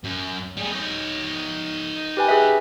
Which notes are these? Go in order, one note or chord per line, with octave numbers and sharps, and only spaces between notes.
F#2
G3 G#4
D#4 C#5
G4 B4 G#5
G#4 B4 E5